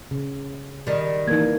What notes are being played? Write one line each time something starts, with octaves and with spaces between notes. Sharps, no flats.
C#3
D#3 G3
E3 A#3 D#4 A#4 G#6